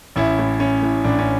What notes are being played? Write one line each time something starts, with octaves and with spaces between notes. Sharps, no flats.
A1 C#4 E4
A2
A2 C#4
A2
A1 D4
C#4